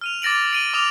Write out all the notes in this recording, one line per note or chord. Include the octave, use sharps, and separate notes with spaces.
F6 D#7 F7
D6 A6 A#6 D7 F#7
D7 D#7 G7
D6 D#6 F6 F7